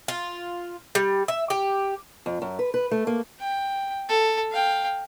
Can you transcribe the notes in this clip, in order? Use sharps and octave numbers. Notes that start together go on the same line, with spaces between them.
F4
G3
E5
G4
F2
F#2
B4
B4
A3
A#3
G5
A4
F5 G5